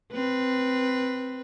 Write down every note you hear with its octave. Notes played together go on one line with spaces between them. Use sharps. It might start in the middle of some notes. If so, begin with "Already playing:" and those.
C4 B4